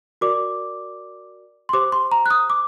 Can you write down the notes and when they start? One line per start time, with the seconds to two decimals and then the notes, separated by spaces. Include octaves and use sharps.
0.21 F#4 A#4 D5 D6
1.69 C6
1.73 G4 C5 D6
1.92 C6
2.12 A#5
2.26 F#6
2.30 D#6
2.50 D6